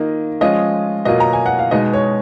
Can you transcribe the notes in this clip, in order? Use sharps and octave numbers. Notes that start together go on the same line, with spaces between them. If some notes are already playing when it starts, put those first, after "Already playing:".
Already playing: D#3 A#3 F4 D#5
F3 G#3 C#4 F4 D#5
B2 F#3 A#3 F4 D#5
A#5
G#5
F#5
F5
B2 G#3 D#4 D#5
C#5